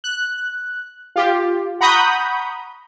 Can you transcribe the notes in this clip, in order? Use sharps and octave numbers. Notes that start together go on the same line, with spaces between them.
F#6
F4 G4
F#5 A#5 B5 C#6 D#6 G6